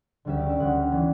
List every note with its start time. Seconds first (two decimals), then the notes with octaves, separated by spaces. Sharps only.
0.25 D2 D3 G3 C#4 E5
0.38 D5
0.49 E5
0.59 D2 D3 G3 C#4 F#5
0.91 E3 B3 D4